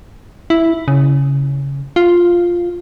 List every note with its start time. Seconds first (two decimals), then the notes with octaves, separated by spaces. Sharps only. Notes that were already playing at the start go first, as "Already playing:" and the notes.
0.50 E4
0.88 C#3
1.96 F4